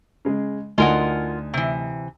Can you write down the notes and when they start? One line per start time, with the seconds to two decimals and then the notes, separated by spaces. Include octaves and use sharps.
0.25 C#3 G#3
0.78 D2 D#4 F4 A#4 F#5 G#5
1.54 C3 E3